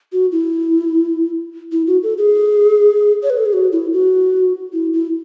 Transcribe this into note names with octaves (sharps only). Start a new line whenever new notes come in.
F#4
E4
E4
F#4
A4
G#4
C#5
B4
A4
G#4
F#4
E4
F#4
E4
E4